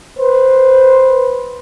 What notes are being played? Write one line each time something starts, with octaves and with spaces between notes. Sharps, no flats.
B4 C5